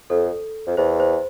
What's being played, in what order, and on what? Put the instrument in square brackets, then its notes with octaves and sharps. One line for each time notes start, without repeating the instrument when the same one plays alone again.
[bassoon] F2 [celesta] A4
[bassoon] F2
[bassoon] E2 [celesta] C5
[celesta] C5